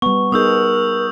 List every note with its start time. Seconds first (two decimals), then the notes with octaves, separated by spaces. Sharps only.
0.02 G3 B3 C#6
0.32 B3 D#4 G#4 A#4 D#6 E6 G6